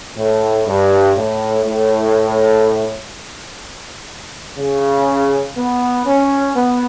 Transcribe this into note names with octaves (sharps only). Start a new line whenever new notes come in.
A2
G2
A2
A2
C#3
B3
C#4
B3